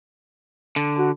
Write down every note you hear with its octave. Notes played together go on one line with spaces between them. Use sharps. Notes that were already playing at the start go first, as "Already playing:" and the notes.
D3 A5
F#4